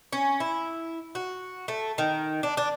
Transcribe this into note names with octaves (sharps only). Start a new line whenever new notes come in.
C#4
E4
F#4
A3
D#3
D4
D4